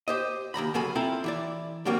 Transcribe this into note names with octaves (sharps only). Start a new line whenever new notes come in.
G4 C5 D#5
D#2 G#2 A#5 B5
F2 C#3 F#3 A4 G#5 B5
C4 E4 F4 A4 A#5 B5
E3 E4 D5
D3 E3 F#3 G3 A#3 C4